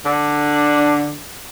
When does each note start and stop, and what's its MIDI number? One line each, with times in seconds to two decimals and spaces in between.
0.05 1.17 50
0.05 1.17 62